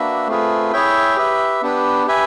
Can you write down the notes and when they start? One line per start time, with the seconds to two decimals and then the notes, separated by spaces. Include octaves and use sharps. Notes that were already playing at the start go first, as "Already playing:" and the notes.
Already playing: A#3 D4 F#4 B4 E5
0.27 A3 C4 F4 G#4 B4
0.73 E4 G#4 C#5 E5 G5
1.16 G4 B4 E5
1.62 B3 D4 G4 B4
2.07 G4 B4 E5 G#5